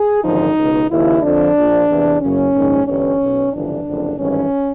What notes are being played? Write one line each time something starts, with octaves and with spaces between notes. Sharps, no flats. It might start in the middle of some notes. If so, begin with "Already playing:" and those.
Already playing: G#4
G#1 F#2 D3 F3 D#4
C#2 B2
D#2 C#3 F3 E4
F2 D3 F3 D4
A#1 A#2 F3
E2 C3 E3
F#1 F#2 C#3 C#4
A#1 G#2 D#3
G1 G2 E3 C#4
B1 B2
G1 F2 C#3 E3 D4
F#1 F2 D3
G#1 G2 E3 C#4